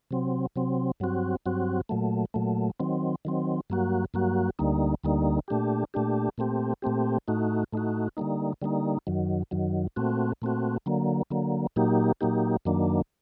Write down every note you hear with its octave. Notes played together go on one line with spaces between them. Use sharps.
C3 F#3 C4
C3 F#3 C4
G2 F#3 C4 F#4
G2 F#3 C4 F#4
A#2 F#3 A3
A#2 F#3 A3
D#3 F#3 C4
D#3 F#3 C4
G2 F#3 A#3 F#4
G2 F#3 A#3 F#4
D2 D3 G3 A#3 D#4
D2 D3 G3 A#3 D#4
A#2 A3 D4 G4
A#2 A3 D4 G4
A#2 A3 C4 G4
A#2 A3 C4 G4
A2 A3 D#4 F#4
A2 A3 D#4 F#4
D3 G3 A#3 D#4
D3 G3 A#3 D#4
F#2 D#3 F#3
F#2 D#3 F#3
A#2 A3 C4 F#4
A#2 A3 C4 F#4
D3 F#3 A#3
D3 F#3 A#3
A#2 F#3 A#3 D#4 G4
A#2 F#3 A#3 D#4 G4
F#2 D#3 F#3 A#3 D4